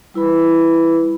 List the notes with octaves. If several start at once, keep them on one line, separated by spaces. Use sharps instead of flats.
G3 E4 B4 B5